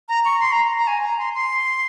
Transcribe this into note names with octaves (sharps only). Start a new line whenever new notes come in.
A#5
C#6
C6
A#5
A#5
G#5
A#5
C6
C6